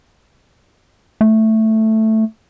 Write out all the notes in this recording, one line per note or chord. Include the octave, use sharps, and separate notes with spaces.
A3